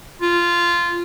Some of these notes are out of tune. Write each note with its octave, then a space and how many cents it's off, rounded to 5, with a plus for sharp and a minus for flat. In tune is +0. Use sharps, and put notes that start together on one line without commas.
F4 -15